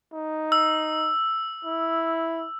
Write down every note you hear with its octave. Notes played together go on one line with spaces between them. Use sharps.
D#4
E6
E4